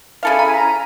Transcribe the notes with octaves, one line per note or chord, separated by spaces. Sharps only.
C#3 E4 A4 F5 G#5 B5
A#5
A#5 B6